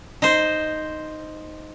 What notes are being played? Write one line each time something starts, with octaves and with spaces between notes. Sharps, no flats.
D#4 C5